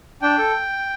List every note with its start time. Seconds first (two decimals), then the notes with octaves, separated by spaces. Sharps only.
0.22 D4 G5
0.38 A4